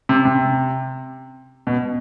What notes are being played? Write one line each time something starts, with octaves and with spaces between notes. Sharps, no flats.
C3
C3
B2